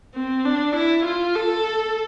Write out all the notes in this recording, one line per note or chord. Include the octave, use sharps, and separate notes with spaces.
C4
D4
E4
F4
A4